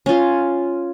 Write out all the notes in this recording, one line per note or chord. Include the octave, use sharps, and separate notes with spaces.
C#4 F4